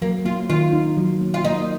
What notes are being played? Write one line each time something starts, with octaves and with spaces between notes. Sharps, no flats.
F#3 A#3
A#3 F4
D#3 F4
D#4
F#3
A#3
F4
A#3 D#4